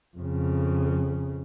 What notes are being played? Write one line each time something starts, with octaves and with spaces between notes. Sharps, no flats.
F2 C#3